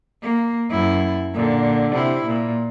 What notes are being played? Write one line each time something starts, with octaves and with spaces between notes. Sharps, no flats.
A#3
F#2 E4
A#2 D3
C3 E4
A#2